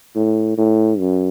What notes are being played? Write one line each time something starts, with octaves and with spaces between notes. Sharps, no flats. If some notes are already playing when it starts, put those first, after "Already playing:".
A2
A2
F#2